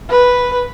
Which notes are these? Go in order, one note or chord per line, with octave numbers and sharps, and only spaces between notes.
B4